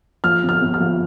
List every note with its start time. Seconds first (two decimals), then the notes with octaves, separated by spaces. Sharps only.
0.24 F3 F6
0.43 G1
0.49 F6
0.62 G1
0.74 F6
0.80 F3